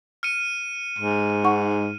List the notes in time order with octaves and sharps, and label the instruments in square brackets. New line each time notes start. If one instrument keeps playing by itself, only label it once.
[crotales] F6 C#7 D#7
[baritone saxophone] G#2
[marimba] D#4 F#5 C#6